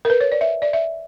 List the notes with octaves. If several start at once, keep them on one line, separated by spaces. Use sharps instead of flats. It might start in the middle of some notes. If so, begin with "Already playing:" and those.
A#4
B4
C#5
D5
E5
D5
E5